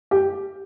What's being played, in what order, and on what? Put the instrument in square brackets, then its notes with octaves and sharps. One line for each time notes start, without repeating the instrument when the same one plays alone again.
[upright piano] G4